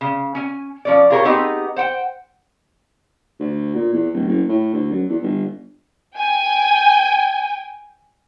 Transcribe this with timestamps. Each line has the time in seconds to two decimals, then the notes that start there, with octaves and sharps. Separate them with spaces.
0.01 C#3
0.35 C#4 G#5
0.85 F3 C#4 D5
1.10 F4 G4 G#4 A#4 B4 C#5
1.25 B3 C4 D#4 G4 G#4
1.76 C5 F#5 G5
3.40 D2
3.75 A#2
3.93 E2
4.14 D1
4.27 F#1
4.49 A2
4.73 D2
4.91 F#2
5.09 E2
5.23 G1
6.16 G5 G#5